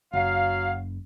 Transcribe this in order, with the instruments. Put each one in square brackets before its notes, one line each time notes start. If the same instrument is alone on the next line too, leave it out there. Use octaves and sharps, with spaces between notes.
[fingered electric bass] F#1 [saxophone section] F#3 F5